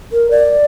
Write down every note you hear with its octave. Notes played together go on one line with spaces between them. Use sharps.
A#4
D5